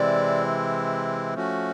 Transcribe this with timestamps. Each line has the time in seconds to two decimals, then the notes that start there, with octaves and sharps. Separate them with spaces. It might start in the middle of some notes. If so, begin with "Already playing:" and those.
Already playing: C3 E3 G#3 C4 E4 D5
1.34 F3 A3 C#4 F#4